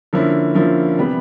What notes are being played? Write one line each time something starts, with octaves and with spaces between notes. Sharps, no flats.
D3 F3 A#3 C#4 E4
D3 F3 A#3 C#4 E4
C3 E3 G3 B3